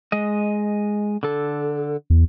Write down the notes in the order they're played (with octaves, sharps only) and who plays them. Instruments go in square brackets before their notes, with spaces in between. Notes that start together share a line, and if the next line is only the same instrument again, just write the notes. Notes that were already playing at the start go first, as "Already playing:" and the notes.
[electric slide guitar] G#3 D#5
D3 A4
[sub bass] E2